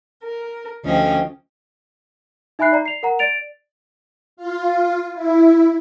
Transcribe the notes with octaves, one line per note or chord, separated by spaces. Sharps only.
A#4
D2 F3 C#4 G4 D#5
D#4 E5 G#5 B5 F#6 C7
D5 A#5
C7 F7
A#4 F#5 A#5
D5 A6 D7 F7
F4
E4